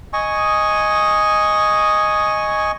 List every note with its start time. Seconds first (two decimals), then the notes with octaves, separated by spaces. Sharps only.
0.13 D#5 G#5 C#6 D#6